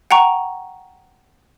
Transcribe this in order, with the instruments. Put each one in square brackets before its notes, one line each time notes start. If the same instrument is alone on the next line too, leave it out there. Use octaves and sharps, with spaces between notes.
[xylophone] F#5 G5 A#5 C#6